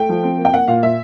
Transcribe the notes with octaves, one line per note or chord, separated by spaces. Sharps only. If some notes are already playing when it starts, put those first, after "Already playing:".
Already playing: A3 G5
F3
C4
A#3
G5
A#3 F#5
A#2 F5
A#2 E5